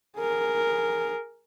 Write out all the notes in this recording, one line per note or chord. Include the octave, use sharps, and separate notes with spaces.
G#4 A#4